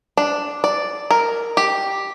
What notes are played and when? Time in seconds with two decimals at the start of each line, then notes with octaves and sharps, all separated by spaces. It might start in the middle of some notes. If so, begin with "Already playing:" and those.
0.17 D4
0.64 D5
1.11 A#4
1.57 G4